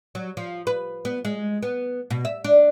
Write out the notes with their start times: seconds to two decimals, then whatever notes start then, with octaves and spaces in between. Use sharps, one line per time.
0.15 F#3
0.37 F3
0.67 B4
1.05 B3
1.25 G#3
1.63 B3
2.10 B2
2.25 E5
2.44 D4